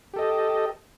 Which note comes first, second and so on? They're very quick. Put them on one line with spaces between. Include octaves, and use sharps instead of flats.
G4 A4 D#5